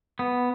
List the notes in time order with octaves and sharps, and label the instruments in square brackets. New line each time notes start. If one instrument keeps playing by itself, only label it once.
[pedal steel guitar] B3